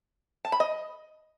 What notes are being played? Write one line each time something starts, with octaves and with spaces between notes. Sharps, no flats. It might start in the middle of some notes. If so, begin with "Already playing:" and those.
A5
B5
D#5